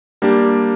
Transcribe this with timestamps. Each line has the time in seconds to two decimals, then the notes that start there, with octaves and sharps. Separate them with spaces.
0.22 G3 A#3 D4 G4